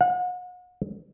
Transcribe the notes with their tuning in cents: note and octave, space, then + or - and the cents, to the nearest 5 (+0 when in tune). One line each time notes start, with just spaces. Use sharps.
F#5 -40